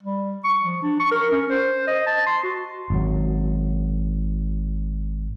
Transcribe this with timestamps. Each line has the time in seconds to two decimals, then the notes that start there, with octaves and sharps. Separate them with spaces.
0.03 G3
0.44 C#6
0.63 F3
0.83 D4
1.00 C#6
1.12 A#4
1.31 C#4
1.50 C5
1.88 D#5
2.07 A5
2.27 C6
2.44 F#4
2.90 G#1 F#2 F#3